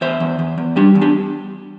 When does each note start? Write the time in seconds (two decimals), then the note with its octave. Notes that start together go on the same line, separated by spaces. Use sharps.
0.01 E2 C5 E5
0.20 E2
0.39 E2
0.58 E2
0.76 G3 D4 G4
0.95 E2
1.01 D4 G4